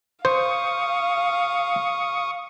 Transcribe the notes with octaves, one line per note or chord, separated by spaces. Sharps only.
C5 F5 C#6 D#6